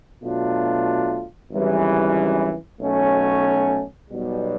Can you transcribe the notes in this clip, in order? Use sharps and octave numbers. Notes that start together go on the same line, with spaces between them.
B2 F#3 A3 D4 F4
G#1 F#2 C#3 E3 G3
B1 B2 F#3 A3 C#4
B1 B2 G3